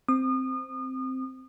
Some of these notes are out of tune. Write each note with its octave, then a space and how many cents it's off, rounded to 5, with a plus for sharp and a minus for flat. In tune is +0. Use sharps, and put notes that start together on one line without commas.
C4 -5 D#6 -35